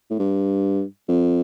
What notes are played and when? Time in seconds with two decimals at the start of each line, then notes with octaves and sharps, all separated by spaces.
0.10 A2
0.19 G2
1.09 F2